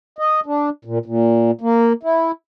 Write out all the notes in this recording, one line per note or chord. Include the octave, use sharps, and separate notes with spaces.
D#5
D4
A#2
A#2
A#3
E4